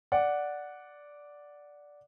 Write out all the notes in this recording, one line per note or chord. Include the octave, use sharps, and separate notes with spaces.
D5 F#5